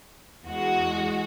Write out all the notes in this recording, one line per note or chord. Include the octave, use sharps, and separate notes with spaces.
E2 G#3 F#4